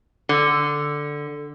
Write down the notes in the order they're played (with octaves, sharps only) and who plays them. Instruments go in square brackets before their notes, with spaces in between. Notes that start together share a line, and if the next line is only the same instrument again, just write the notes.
[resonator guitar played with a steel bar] D3